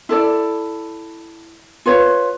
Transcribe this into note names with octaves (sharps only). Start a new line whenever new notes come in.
E4 A4 D5
F4 B4 C#5